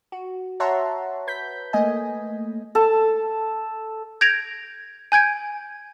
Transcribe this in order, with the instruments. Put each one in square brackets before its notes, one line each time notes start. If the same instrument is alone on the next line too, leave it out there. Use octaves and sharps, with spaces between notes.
[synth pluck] F#4
C#5 E5 F#5 A5 A#5 C6
B4 G6 B6
A3 A#3 D#5 G#5
[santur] A4 A5
[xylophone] G6 G#6 A#6 D7 F7
G#5 G6 G#6 D7